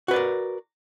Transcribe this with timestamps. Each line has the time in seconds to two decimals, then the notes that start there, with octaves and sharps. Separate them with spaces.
0.08 F#4
0.11 B4
0.13 D5
0.16 A#4